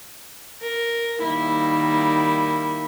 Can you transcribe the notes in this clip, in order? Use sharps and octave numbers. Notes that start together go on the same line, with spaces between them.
A#4
D#3 G3 A#3 E4